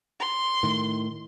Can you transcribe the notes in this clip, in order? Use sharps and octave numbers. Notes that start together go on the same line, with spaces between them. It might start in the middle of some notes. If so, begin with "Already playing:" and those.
C6
A2 D#3